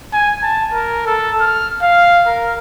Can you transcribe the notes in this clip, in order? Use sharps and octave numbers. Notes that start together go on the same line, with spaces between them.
G#5
A5
A#4
A4
F6
F5
A#4